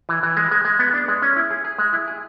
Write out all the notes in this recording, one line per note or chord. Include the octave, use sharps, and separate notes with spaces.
E3
E3
G#3
G#3
G#3
B3
D4
G#3
C#4
E4
G#4
G#4
G#3
E4
G#4